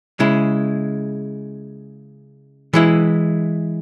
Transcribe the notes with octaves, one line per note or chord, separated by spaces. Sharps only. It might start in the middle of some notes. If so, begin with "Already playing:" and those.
C#3 G#3 E4
E3 G#3 E4